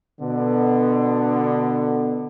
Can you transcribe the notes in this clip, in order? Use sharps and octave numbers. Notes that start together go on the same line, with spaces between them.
B2 D3 B3